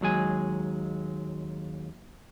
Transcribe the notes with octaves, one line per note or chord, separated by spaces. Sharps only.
D#2 F#3 G#3 G#5